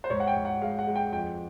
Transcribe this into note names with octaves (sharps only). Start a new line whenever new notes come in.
C5
G#2 C#5
F#5
G5
G#2
F#5
G#3 F5
F#5
G#3
G5
F2 G5